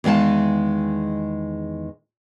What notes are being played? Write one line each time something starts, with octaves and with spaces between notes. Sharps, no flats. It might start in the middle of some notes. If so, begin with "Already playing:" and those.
E2 D#3 G#3 F5 A5